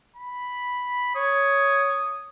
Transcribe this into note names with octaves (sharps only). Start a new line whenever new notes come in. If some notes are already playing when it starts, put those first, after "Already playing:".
B5
C#5 D#6